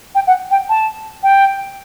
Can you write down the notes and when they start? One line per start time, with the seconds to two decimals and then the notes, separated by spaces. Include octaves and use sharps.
0.15 G5
0.27 F#5
0.51 G5
0.69 A5
1.23 G5